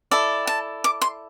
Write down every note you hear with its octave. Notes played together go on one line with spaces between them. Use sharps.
E4 A4 D5
A5
D6
C6